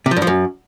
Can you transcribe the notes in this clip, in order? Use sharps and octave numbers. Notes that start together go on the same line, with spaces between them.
C3
F3
G2
F3
F#2